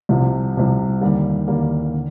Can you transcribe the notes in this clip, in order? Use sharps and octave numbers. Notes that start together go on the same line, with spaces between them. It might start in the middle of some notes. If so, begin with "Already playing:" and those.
C2 C3 F3
C2 C3 F3
D#2 D3 G3 A#3
D#2 D3 G3 A#3
D3